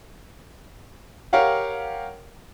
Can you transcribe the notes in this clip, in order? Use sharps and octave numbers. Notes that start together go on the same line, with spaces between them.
G4 A#4 C#5 F5 F#5